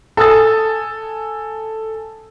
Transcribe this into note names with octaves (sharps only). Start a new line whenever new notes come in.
A4 G#5 D#6 E6 A6